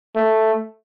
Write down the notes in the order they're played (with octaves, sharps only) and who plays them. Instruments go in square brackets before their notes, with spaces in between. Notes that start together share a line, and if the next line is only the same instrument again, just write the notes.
[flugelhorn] A3